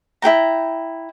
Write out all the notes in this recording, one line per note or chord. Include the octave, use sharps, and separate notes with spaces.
E4 G#4 G5 A#5